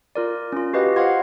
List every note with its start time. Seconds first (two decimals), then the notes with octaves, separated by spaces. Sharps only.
0.15 F4 A#4 D5
0.52 C#4 F4
0.73 F#4 G4 B4 D#5 F5
0.96 C5 D#5 F5 F#5 C6 G#6